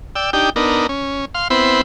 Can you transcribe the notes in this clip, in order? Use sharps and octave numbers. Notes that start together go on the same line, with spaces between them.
D5 G5 E6
D4 D#4 G4 G5
B3 D4 D#4 A#4
C#4
F5 C6
B3 C4 E4 C5 B5